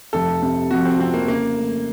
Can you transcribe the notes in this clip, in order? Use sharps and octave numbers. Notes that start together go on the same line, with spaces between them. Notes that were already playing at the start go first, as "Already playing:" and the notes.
F1 A4
C3
F2 F#4
C4
F3 C4
A#3
C#3 A#3
A3